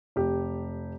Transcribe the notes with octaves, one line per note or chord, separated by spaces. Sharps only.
F1 G4